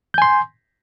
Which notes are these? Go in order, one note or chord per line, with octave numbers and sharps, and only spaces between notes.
G#5 C6 G6